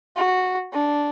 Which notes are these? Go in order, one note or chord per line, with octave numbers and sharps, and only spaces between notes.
F#4
D4